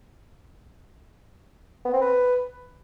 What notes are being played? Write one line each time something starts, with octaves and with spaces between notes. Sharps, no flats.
B3
C4
B4